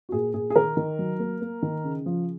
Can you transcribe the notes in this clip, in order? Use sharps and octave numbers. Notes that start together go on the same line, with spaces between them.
F#4
A#2 G#4
A#2 G#4
G#4
D#3 A#4
D#3
F#3
A#3
A#3
D#3
C#3
F3